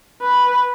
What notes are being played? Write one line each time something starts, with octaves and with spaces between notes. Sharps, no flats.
B4